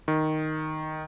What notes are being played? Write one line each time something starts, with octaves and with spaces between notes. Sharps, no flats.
D#3